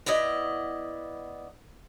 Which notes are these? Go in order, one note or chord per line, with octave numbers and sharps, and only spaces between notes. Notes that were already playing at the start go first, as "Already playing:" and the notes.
B3 E4 D5 D#5